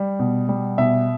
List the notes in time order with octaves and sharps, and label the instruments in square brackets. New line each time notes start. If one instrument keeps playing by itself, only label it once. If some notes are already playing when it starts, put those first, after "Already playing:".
Already playing: [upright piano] G3
B2
G3
B2 E5